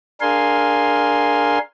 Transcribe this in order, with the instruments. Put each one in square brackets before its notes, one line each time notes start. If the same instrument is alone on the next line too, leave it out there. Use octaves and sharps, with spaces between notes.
[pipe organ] D4 G#4 A#4 F5 G#5 C6